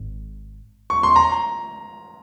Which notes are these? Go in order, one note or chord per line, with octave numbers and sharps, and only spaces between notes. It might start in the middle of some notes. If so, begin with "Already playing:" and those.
Already playing: G#1 G#2
C#6
C6
A#5